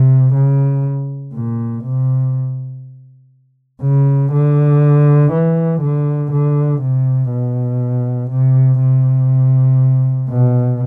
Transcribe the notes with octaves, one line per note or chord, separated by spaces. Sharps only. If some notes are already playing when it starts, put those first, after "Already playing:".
Already playing: C3
C#3
A#2
C3
C#3
D3
E3
D3
D3
C3
B2
C3
C3
B2